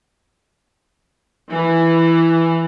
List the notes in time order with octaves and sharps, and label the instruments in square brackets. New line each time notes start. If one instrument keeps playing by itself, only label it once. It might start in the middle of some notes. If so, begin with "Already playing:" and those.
[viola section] E3